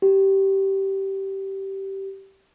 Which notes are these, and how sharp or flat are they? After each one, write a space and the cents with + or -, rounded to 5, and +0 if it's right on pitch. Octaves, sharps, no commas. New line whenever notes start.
G4 -15